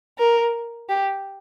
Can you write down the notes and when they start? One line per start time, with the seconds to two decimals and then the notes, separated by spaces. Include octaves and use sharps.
0.19 A#4
0.89 G4